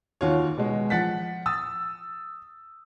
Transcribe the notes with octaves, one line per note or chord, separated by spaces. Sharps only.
D#2 F4 F#4 C#5
B2 G#3
F3 F#5 A6 B6
D#6 E6 A6